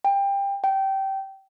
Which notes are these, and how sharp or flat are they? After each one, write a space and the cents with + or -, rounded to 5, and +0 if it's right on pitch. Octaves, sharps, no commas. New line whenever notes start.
G5 +20
G5 -20